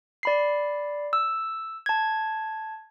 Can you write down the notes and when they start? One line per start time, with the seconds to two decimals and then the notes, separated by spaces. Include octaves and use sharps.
0.23 D5 B5 C7
1.13 E6
1.86 A5 G#6